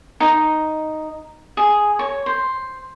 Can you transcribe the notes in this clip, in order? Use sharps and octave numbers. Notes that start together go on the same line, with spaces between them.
D#4
G#4
C#5
C5